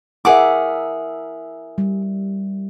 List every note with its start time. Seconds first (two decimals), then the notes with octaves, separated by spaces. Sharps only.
0.25 E4 G#4 A#4 E5 F#5 D6
1.78 G3